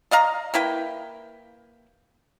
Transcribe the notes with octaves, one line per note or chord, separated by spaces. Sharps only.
D5 D#5 F5 A#5
A#3 E4 B4 G5